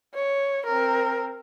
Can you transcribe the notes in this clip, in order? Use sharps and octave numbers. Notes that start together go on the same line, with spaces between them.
C#5
C4 A#4